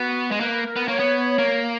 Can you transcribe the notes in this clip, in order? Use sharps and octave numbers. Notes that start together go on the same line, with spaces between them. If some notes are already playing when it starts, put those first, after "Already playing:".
Already playing: B3 F#4
G#3
A#3 B4
A#4
B3
A#3 C#5
B3
A#3